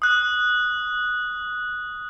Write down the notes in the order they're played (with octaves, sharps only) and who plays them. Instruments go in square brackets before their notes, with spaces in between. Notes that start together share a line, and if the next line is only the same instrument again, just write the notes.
[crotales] D#6 F#6